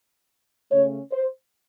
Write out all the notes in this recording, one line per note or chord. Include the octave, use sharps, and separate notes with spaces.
C#3 A3 C#4 C#5
C5